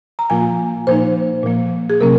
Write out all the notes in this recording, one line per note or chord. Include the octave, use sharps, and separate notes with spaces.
A#5
A#2 F3 A#3 F4 G#5
A#2 F3 A#3 D#4 C5
A#2 F3 A#3
G#4
C3 F#3 A#3 C#4 A#4